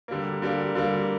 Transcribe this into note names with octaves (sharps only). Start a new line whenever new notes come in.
D3 G3 A#3
D3 G3 A#3
D3 G3 A#3